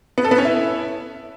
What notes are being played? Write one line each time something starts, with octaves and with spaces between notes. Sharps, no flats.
B3
A4
B3
C#4
E4